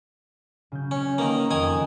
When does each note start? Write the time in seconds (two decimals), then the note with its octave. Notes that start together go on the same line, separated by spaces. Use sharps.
0.72 C#3 F#3 G6
0.91 C#4
1.18 D#3 A#3 B4 D#5
1.51 F#1 F2 D#3 G#5 D#6